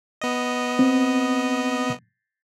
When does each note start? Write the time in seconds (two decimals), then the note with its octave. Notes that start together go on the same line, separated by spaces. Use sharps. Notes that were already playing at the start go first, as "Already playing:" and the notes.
0.21 B3 D#5
0.79 C4